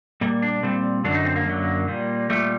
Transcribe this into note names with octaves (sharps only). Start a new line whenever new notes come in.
A#2 G3 A#3
D4
A#2 G3 C4
F#2 D3 F#3 D4
D#4
C4
A#3
F#2 D3 F#3
A#2 G3
A#2 G3 A3